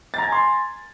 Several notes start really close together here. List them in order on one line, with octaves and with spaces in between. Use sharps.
A6 A#5 G#6 G#5 C6